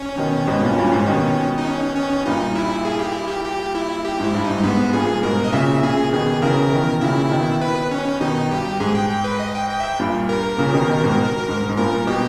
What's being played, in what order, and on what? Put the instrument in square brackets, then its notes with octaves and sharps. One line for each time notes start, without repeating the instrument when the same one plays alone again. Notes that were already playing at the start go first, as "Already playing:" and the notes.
Already playing: [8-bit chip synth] C#4
[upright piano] B2 D#3
G#2 B2
G2 A#2
G2 A#2
G#2
B2 D#3
[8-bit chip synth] D#4
C#4
C#4
[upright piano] G2 A#2 [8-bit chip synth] D#4
[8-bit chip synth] E4
G#4
G4
E4
G4
G4
E4
G4
[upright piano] G#2 [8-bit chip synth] E4
[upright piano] G2
[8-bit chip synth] D#4
[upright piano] G#2
[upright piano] G#2 [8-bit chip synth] B3
[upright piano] G2 A#2 [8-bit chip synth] G#4
[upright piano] G#2 B2 [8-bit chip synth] A#4
[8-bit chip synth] D#5
[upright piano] A#2 C#3 [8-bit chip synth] E5
[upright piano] A#2 C#3 [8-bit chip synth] G#4
[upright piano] B2 D#3 [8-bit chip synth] G#4
[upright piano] C#3 E3 [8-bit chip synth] A#4
[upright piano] B2 D#3
[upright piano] A#2 C#3 [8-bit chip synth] E4
[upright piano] B2 D#3
[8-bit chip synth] B4
C#4
[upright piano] B2 D#3 [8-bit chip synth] D#4
[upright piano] G2 [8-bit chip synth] G4
[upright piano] G#2 [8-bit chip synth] G#4
[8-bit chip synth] G5
G5
B4
D#5
G5
G5
E5
G5
[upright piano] G2 A#2
[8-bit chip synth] A#4
[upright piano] A#2 C#3
B2 D#3
B2 D#3
G#2 B2
G#2
G#2
[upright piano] G2 A#2 [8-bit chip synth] A#4
[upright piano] B2 [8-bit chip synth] G4